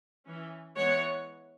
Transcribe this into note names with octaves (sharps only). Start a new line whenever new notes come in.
E3 C#4
E3 G#3 B3 C#5 F#5